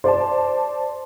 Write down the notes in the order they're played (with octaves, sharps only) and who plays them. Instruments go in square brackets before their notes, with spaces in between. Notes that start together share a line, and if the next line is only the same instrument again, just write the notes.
[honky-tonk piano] C5 D5 A5